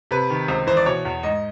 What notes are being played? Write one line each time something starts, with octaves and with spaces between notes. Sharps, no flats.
C3 B4
D#3
C#2 C5
E3 C5
D5
B2 C#5
E2
G#2 D#5